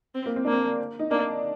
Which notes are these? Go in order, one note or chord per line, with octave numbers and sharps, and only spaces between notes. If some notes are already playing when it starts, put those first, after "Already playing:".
C4
A#3
C4
A#3 D4
C4
D#4
A#3 D4